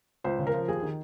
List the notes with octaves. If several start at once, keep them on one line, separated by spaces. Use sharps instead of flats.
C#2 C5
C#3
A#4
F3
D#2 G#4
D#3